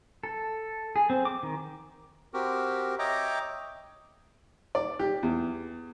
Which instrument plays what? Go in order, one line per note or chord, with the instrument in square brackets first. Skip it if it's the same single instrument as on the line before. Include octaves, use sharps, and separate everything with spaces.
[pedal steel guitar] A4
G#4
C4
D6
D#3
[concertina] C4 F#4 G4 A#4
C#5 D#5 E5 G5 A#5 D6
[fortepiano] D5
G4
E2